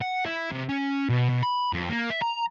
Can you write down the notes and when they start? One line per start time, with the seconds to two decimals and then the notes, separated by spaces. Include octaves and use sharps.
0.01 F#5
0.26 E4
0.52 C3
0.69 C#4
1.09 B2
1.29 B2
1.43 B5
1.73 F2
1.89 A#3
2.10 E5
2.22 A#5